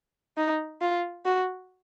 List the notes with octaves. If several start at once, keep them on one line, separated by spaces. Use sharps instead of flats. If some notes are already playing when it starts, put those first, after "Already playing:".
D#4
F4
F#4